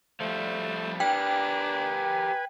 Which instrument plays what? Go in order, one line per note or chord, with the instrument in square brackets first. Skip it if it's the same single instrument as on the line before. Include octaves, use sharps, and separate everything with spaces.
[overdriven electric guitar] F3 G3 [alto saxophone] A3
[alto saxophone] D4 [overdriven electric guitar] G4 A#4 [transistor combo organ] B4 G#5 [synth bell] G5